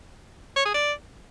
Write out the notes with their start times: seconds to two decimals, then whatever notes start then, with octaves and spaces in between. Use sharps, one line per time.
0.56 C#5
0.65 G#4
0.74 D5